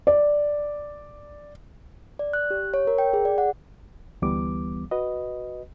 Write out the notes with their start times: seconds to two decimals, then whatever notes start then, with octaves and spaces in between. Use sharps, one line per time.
0.07 D5
2.19 D5
2.33 F#6
2.51 G4
2.74 C#5
2.87 A#4
2.98 G5
3.13 G#4
3.25 D5
3.38 F#5
4.22 D2 E3 G3 B3 D6
4.91 F#4 B4 D#5